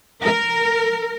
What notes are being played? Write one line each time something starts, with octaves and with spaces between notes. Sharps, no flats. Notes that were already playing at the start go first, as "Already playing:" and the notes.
A#4